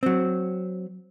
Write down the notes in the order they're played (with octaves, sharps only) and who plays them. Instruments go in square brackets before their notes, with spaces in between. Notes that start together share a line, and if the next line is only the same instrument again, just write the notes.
[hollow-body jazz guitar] F#3 C4